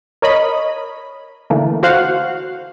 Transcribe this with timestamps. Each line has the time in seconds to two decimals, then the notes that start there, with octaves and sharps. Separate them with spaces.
0.22 A#4 C#5 D#5 B5
1.50 D3 E3 A3 A#3
1.83 F#4 C5 F5 F#5